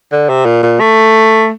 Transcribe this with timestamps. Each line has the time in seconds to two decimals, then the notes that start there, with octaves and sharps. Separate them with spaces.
0.12 D3
0.29 C3
0.45 A#2
0.63 A#2
0.80 A3